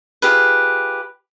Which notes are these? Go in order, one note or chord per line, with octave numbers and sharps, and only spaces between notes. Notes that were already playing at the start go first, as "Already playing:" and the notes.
F4 G4 G#4 B4